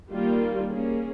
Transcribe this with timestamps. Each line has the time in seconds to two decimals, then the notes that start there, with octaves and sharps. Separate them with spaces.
0.12 D#3 G3 A#3 F4
0.70 A#3 C#4 G#4